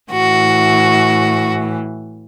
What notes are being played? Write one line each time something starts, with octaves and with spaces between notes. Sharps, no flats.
A2 E3 F#4